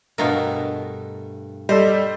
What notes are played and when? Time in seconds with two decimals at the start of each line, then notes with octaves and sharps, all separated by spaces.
0.18 G2 B2 A3 F4 A#4
1.69 G3 A4 C5 D#5